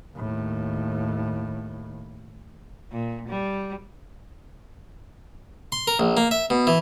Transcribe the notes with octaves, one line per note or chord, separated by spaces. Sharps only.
D#2 A2
A#2
G3
C6
A#4
A#1
A#3
E5
B2
E3